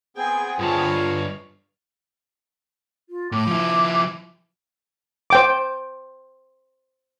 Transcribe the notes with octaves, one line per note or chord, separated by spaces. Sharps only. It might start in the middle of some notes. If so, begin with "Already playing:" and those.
B3 C4 G#4 G5 G#5
G2 D3 F4 C#5 F5 A5
F4
A2 D6
F3 E4
C5 G5 D6